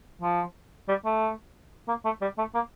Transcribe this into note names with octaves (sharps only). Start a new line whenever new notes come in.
F3
G3
A3
A#3
A3
G3
A3
A#3